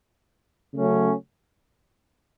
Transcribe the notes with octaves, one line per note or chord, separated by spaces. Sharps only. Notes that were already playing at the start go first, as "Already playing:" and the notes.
C#3 F#3 A3 C#4